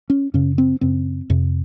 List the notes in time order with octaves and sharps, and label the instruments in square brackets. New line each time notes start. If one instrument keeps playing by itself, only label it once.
[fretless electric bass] C#4
F#2 C#3 C#4
C4
F#2 C#3 C4
F2 C3